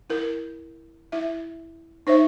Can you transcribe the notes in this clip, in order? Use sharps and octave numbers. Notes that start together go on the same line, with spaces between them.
E4 A#4
E4 E5
D#4 C5 C#5 E5